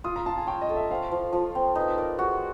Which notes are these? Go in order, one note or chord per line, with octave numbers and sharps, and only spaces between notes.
F4 D#6
A#5
F4 A5
G#5
C#5 G5
D#5
A4
E5
C4 F5
F3
F3
C4
D#4 B4
A#4 D5
F#4 G#4